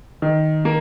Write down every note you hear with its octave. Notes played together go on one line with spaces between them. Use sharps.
D#3
A#3